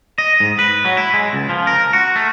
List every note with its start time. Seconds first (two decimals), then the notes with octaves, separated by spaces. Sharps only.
0.18 D#5
0.40 G#2
0.59 B4
0.85 F#3
0.97 E4
1.14 G#3
1.33 C#2
1.49 F3
1.67 A#4
1.93 F#4
2.16 A3